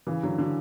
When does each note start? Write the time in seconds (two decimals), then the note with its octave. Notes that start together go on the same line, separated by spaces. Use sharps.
0.07 C#3 E3
0.23 D3 F#3
0.38 D3 F#3